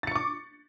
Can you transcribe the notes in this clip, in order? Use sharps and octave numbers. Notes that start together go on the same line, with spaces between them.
C#6 D6 A6 C#7